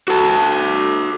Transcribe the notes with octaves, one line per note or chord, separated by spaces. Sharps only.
F#4 A4 A5